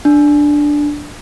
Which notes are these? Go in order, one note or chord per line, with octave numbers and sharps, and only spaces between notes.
D4